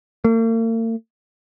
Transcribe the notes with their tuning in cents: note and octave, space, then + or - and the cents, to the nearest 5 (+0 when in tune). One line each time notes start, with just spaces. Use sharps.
A#3 -45